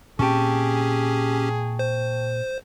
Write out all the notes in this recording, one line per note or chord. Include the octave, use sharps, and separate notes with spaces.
A#2 C4 C#4 G4 G#4 G5 A5 C#6
C5